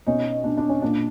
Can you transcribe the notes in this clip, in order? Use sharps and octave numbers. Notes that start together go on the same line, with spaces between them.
B2 C#4 D#4
B2 D4
D4
C#4
A#2 D4